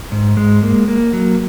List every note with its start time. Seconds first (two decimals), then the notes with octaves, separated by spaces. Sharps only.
0.12 G#2
0.37 G#3
0.63 A#3
0.88 A#3
1.13 F#3